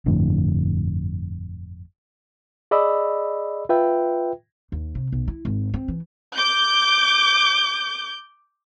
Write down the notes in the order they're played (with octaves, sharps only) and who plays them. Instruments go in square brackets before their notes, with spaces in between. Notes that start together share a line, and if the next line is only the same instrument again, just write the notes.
[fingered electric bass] G1 F2 A2 D3
[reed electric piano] G#4 D5 D#5 B5 E6
F4 B4 E5 G5
[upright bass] D#2
C3
B1
E4
G#1
C4
E3
[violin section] D6 G6